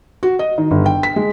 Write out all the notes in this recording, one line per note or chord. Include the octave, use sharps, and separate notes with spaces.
F#4
D#5
D#3
G1
G5
B6
G#3